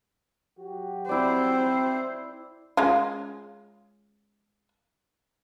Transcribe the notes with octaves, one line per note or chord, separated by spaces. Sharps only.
F#3 F#4 G4
C4 E4 C5 D5
G#3 C#4 F4